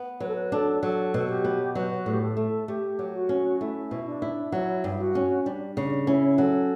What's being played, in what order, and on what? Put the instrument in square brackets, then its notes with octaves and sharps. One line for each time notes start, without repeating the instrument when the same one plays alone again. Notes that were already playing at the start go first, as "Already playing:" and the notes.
Already playing: [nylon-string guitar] B3
[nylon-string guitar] F#3 [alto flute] B4
[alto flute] A4
B4
[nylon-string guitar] D4 [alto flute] A4
[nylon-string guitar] F#3 [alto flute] A4
[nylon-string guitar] B2
[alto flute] G4
[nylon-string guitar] B3
[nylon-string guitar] F#3 [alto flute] B4
[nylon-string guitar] A2
[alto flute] G4
A4
[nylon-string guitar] A3
[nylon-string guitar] A3 [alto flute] G4
[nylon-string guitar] F#3
[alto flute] F#4
[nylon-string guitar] C#4
[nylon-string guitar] A3 [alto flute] E4
[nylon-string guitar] B2
[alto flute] D4
[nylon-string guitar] E4
[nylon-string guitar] F#3 [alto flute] E4
[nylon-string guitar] G2
[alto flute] F#4
[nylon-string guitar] C#4
[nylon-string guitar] G3 [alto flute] D4
[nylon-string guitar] C#3 [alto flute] D4
[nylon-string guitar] C#4 [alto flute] E4
[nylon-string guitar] F#3 [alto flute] A4